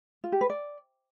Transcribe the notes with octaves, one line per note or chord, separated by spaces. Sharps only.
F4
G4
B4
D5